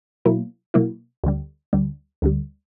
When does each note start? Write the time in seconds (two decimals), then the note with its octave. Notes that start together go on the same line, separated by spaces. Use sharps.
0.25 B2 F#3 A#3 E4
0.74 B2 F#3 A#3 E4
1.24 D2 D3 G3
1.73 D2 D3 G3
2.22 D2 D3 G3